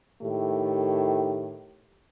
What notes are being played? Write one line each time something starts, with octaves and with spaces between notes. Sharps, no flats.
A2 D#3 A3 G4